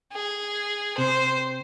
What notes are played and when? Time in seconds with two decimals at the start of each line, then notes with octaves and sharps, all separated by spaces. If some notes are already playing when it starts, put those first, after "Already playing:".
0.13 G#4
0.98 C3 C5